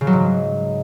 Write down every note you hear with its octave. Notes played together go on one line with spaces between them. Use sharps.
C#3
F#3
G#2